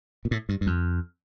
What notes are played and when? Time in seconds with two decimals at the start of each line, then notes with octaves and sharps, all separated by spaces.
0.25 A#2
0.31 A2
0.49 G2
0.61 G2
0.67 F2